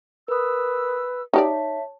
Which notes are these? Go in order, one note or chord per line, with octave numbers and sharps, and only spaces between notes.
A#4 B4 D#6 E6
D#4 G4 C#5 D5 E5 A5